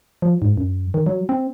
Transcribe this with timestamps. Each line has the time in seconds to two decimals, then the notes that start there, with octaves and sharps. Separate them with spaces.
0.22 F3
0.42 G#2
0.57 F#2
0.94 D#3
1.06 F#3
1.29 C4